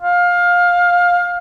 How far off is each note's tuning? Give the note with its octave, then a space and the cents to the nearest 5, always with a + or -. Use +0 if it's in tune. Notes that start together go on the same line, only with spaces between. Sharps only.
F5 +20